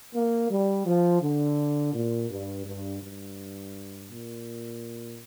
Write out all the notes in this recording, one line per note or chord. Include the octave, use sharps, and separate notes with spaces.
A#3
G3
F3
D3
A#2
G2
G2
G2
A#2